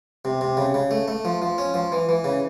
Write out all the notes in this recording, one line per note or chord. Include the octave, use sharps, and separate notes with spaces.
C3
C3
C#3
C#3
A3
A3
F3
F3
C#4
F3
E3
E3
C#3